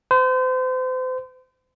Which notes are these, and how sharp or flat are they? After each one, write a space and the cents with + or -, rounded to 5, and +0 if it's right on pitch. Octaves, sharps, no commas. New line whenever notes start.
C5 -35